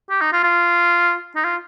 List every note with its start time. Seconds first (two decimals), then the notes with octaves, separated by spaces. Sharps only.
0.10 G4
0.21 D#4
0.33 F4
0.43 F4
1.36 D#4
1.44 F4